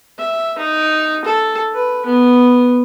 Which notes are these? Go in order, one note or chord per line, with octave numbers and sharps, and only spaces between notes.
E5
D#4
A4
B4
B3